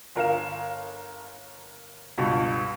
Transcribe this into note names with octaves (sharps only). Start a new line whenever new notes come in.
G1 A#4 F5 E7
C#2 G2 B2